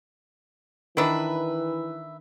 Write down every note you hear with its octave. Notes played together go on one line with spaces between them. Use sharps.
D#3 E3 D4 B4 E5